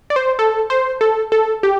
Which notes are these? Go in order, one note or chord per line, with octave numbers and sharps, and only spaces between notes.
D5
C5
A4
C5
A4
A4
G4